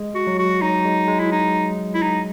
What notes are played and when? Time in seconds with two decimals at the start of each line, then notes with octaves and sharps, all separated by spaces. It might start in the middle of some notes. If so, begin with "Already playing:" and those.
Already playing: G#3
0.15 F#4
0.27 F#3
0.39 F#4
0.61 F#3 D#4
0.85 G#3
1.08 G#3
1.20 E4
1.32 D#4
1.94 E4
2.02 D#4